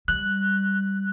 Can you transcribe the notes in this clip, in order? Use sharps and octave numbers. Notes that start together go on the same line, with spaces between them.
G3 F#6